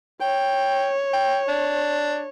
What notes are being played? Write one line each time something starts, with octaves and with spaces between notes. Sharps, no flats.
C#5 G5
G5
D4